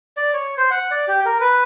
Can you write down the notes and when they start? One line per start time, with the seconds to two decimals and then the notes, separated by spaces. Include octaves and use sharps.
0.17 D5
0.34 C#5
0.58 C5
0.71 F#5
0.91 D5
1.08 G4
1.26 A#4
1.41 B4